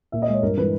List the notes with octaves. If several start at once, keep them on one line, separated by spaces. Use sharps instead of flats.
A#2 E5
D#5
G#3 C#5
G2 A#4
E3 G#3 B4